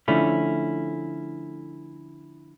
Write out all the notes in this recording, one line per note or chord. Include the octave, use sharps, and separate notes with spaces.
D3 F3 A3 C#4 E4